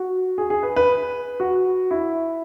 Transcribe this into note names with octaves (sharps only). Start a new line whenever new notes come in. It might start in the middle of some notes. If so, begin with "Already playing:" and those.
Already playing: F#4
G#4
G#4
B4
B4
F#4
E4